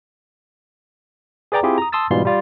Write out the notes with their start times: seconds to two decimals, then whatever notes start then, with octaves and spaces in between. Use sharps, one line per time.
1.52 G#4 B4 D5 G5 A#5 D6
1.63 C4 E4 F4 G4 G#4
1.78 A#5 D#6
1.92 A5 C6 D#6 E6 A6
2.11 G#2 B2 E3 G3 F4 C6
2.25 G3 F4 D5